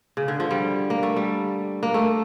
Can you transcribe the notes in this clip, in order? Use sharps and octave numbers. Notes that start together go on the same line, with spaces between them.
C#3
D3
F3
G3
A#3
A3
G3
A#3
A3